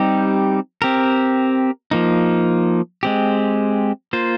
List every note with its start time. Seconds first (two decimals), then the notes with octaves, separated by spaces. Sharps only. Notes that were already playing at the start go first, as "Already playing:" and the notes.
Already playing: G3 C4 D#4 G4
0.82 C4 G4 A#4
1.91 F3 A#3 D#4
3.03 G#3 C4 G4
4.13 A#3 F4 C5